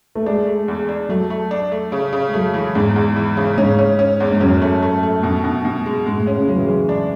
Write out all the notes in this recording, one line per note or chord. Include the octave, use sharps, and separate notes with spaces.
A3
G#3 D4
A3
E2
D4
F#3 A3
A3
D4
A3
C#3
C#3
G#3
F#3 A3
E3
E2 G#2
E2
E3
C#3
G#2 C#4
C#4
C#4
E2
G#2
F#2 C#4
A3
A3
A3
F#2 B2
B2
B2
G#3
G#2 G#3
A2
C#4
C#3
F#3 G#3
E3
F#3 G#3
D4